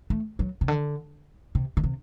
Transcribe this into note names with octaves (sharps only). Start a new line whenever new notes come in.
A3
F#3
C3
D3
C3
D3
C3